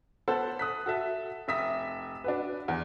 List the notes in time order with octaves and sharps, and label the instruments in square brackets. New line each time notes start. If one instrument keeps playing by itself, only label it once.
[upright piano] B3 A4 C5 F#5
D#6 F#6 B6
F#4 A4 E5
F1 E5 D#6 B6
D4 F#4 B4
E2